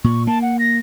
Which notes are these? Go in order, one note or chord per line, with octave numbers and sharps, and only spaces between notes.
A#2 C#6
A#3 A5
F#5
A#6